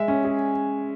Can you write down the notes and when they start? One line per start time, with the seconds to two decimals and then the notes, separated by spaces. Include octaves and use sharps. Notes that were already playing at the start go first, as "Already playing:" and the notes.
Already playing: G#3 E5
0.08 C#4
0.25 G#4